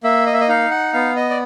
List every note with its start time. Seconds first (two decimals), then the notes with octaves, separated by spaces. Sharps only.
0.03 A#3 E5
0.26 D#5
0.33 E5
0.41 D#5
0.48 D#4 F5
0.71 F#5
0.93 B3 F5
1.16 D#5
1.30 D5